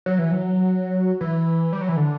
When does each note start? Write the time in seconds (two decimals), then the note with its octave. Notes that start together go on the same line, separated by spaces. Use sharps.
0.06 F#3
0.19 E3
0.32 F#3
1.21 E3
1.73 G3
1.81 F#3
1.89 E3
1.97 D3